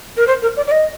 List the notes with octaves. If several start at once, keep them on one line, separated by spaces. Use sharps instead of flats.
A#4
C5
A#4
D5
D5
D#5